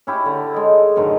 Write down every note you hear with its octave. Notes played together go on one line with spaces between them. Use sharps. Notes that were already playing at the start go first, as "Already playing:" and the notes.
C#4 E4 G4
D3
G#3 D#5
F#2 A2 D3 D#3